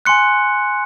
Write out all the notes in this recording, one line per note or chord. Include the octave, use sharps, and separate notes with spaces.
G#5 C6 F#6 C#7